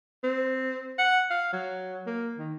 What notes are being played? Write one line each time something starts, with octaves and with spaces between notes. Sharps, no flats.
C4
F#5
F5
F#3
A#3
D#3